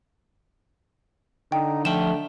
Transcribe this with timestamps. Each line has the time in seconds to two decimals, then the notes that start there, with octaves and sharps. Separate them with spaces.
1.52 D3 D#4 G5
1.85 F3 A3 G5 E7